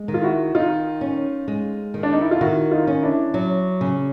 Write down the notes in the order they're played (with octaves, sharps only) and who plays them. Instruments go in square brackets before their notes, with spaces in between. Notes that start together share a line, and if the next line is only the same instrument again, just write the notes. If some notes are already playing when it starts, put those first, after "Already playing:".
Already playing: [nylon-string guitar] G#3
D#3
[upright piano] F4
E4 F#4
[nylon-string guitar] D#3 [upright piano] D#4 F4
[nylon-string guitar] C#4
G#3
D#3
[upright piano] D4
D#4
E4
F4
[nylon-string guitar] D#3 [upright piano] E4 F#4
[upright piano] D#4 F4
[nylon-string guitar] C#4
[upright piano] D4 E4
[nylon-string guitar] F#3
C#3